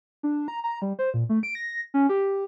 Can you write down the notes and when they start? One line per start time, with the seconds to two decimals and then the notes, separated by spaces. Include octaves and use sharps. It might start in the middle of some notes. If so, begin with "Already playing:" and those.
0.23 D4
0.48 A#5
0.64 A#5
0.82 G3
0.99 C5
1.14 A#2
1.29 A3
1.43 D7
1.55 A#6
1.94 C#4
2.09 G4